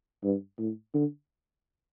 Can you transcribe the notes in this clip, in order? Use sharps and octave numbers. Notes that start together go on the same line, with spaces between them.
G2
A2
D3